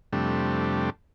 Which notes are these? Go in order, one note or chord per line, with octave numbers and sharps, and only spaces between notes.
F2 C3 G3 A3 D4